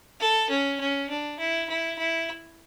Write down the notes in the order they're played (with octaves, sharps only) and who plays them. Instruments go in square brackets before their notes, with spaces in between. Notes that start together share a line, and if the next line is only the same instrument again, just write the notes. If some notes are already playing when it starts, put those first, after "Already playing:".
[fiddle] A4
C#4
C#4
D4
E4
E4
E4